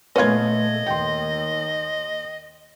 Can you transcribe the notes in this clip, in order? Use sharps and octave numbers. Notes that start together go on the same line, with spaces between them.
A#2 A3 B3 C#4 F4 D#5 G#6
D#2 G5 C6